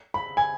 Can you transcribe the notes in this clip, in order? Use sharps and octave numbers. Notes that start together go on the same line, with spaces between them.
B5
G#5